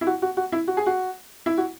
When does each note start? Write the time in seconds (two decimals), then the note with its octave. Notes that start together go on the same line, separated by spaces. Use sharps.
0.01 E4
0.07 F#4
0.22 F#4
0.37 F#4
0.52 E4
0.68 F#4
0.77 G#4
0.86 F#4
1.46 E4
1.58 F#4